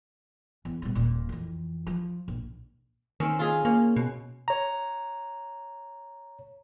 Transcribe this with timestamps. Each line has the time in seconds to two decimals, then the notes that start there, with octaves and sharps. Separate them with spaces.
0.65 E2
0.82 B2 G3
0.95 D#1 A#2
1.29 F2 E3
1.87 F3
2.28 A#1
3.20 D#3 C4 C#4
3.39 F4 G#4 D#5
3.65 A#3 C#4
3.96 B2
4.48 C#5 A#5